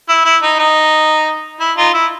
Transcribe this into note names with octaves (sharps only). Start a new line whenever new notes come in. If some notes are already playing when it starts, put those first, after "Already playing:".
E4
E4
D#4
D#4
E4
D#4 F4
E4